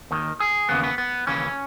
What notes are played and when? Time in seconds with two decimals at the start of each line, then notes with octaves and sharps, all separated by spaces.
0.11 D#2 D#3
0.40 G#4
0.69 D#2 C#3 E3 B3
0.83 B3
0.98 B3
1.27 D#2 C#3 E3 C#4